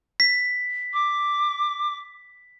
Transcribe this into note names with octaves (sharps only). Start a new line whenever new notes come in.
B6
D6